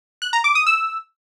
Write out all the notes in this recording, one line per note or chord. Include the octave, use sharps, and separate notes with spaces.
F#6
A#5
D6
D#6
E6